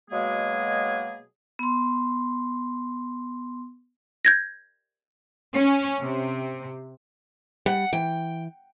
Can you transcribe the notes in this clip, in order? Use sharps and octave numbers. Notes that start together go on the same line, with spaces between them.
B2 F#3 G#3 A#3 G#4
B3 C6
G6 G#6 A#6
C#4
C3
G3 F#5
E3 G5